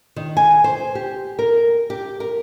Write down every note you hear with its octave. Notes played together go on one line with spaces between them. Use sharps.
D#3
G#5
C5
G4
A#4
G4
A#4